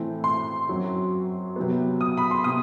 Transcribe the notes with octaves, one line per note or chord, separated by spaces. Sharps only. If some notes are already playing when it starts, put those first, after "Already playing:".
Already playing: A2 E3 A3 C4
C6
F#2 F#3 C4
C3 F#3 B3
D#6
B5
C6
C3 D#6